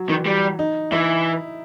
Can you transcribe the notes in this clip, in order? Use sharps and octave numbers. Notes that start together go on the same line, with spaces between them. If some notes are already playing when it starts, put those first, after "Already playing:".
Already playing: F#3
D#3 E3
G3
D#4
E3 E4